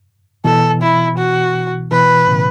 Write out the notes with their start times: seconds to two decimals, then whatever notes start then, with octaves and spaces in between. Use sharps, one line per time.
0.45 B2 E3 A4
0.82 E4
1.18 F#4
1.91 B2 E3 B4
2.27 A2 C#3